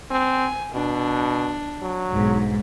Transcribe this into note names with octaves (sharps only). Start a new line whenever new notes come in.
C4 G#5
B2 D4
F#3
B1 G#2